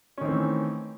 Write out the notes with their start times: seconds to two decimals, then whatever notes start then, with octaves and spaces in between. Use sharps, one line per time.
0.18 C#4
0.21 D#3
0.25 C4
0.29 E3
0.32 A3